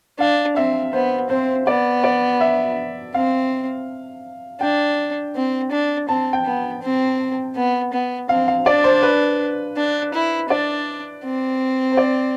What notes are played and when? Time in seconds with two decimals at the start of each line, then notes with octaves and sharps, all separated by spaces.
0.20 D4 F5
0.56 C4 E5
0.93 B3 C5
1.30 C4 C5
1.67 B3 D5
2.04 D5
2.41 E5
3.14 C4 F5
4.61 D4 G5
5.35 C4
5.71 D4
6.09 C4 A5
6.33 G5
6.45 B3
6.82 C4
7.56 B3
7.93 B3
8.29 C4 F5
8.48 F5
8.66 D4 D5
8.84 C5
9.03 B4
9.77 D4
10.14 E4
10.50 D4 D5
11.24 C4
11.92 C5
11.97 D5